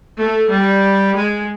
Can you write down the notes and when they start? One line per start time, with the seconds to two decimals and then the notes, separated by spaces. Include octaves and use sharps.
0.20 A3
0.53 G3
1.19 G#3